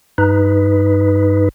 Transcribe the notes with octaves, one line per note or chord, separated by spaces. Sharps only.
G2 D#4 B4